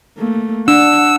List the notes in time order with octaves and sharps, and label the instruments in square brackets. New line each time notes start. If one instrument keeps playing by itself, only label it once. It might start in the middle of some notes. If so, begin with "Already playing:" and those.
[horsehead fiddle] A3 A#3
[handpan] D4 [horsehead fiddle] F#5 [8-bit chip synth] E6